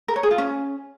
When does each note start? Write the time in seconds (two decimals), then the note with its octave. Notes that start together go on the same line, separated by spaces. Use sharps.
0.08 A#4
0.16 C#5
0.23 G#4
0.31 F4
0.38 C#4